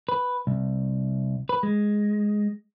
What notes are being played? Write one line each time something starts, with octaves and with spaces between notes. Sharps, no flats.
B4
C2
B4
G#3